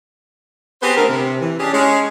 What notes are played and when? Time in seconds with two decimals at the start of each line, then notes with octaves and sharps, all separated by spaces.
0.82 B3 C4 G4 G#4 B4 C5
0.97 D3 A3 C4 A#4
1.10 C3
1.40 E3
1.60 C#4 D4 G4 G#4
1.73 G#3 C#4